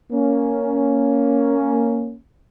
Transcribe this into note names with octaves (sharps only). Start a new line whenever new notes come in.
A#3 C#4